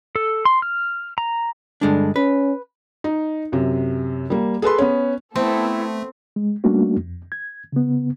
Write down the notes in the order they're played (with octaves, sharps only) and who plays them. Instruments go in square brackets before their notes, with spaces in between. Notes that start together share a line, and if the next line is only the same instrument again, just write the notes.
[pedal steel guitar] A4
C6
F6
A#5
[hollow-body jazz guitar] G2 G#3 D4 [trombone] D3
[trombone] C#4 [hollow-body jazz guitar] B4
[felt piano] D#4
F#2 C3
G3 A#3
G#4 A4 B4 C6
B3 C#4
[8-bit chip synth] A3 [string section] B3 A4 [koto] C4 [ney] E4
[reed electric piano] G#3
G3 A3 A#3 C#4 D4 F#4
F2
G#6
C#3 B3